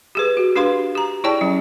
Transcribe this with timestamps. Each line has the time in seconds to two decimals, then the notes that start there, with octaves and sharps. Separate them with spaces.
0.15 G4 G#4 B4
0.37 F#4
0.56 D4 G4 B4 F5 C6
0.95 G4 A#5
1.24 E4 G#4 C#5 D5 G5 A5
1.41 F#3 C#4